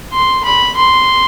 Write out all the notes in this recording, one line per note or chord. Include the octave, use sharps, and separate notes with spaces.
C6
B5
C6